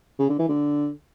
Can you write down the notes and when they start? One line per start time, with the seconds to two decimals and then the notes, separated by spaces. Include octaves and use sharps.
0.19 C#3
0.29 D3
0.39 E3
0.49 D3